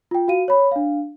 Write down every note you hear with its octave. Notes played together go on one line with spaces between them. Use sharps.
F4 G5
F#4 F5 D#7
C#5 B5
D4 F5